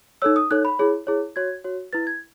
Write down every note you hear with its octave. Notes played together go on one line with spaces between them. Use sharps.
D#4 A4 C#5 E6
D#6
D#4 A4 C#5 F#6
B5
E4 G#4 C#5
E4 G#4 C#5
F#4 C#5 G#6
F#4 C#5
E4 B4 A6
G#6